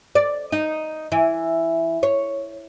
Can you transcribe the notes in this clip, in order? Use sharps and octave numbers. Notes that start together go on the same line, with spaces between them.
D5
D#4
E3
C#5